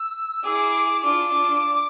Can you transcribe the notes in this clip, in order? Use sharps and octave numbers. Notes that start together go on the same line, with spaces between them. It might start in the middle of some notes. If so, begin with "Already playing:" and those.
Already playing: E6
E4 G#4 D6
D4 F4 D6
D4 F4